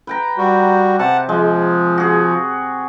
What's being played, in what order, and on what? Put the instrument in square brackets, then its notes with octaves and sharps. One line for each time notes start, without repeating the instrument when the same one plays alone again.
[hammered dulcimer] B4 G5 A#5
[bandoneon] G3 F#4
[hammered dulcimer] C3 [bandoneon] F#5 A5
[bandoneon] F3 [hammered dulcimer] G#3
[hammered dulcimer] F#4 G#4